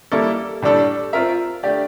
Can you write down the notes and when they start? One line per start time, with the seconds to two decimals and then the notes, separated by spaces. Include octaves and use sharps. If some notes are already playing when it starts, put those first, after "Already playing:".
0.12 G3 A#3 E4 A4
0.62 A2 G3 D4 A4
1.13 C4 F4 A#4 E5
1.63 A3 D4 G4 D5